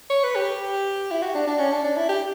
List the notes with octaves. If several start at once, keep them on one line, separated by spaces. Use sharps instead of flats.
C#5
B4
G4
E4
F#4
D4
D4
C#4
D4
D4
E4
G4